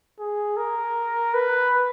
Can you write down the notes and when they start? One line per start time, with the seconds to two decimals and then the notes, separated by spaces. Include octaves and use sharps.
0.19 G#4
0.57 A#4
1.34 B4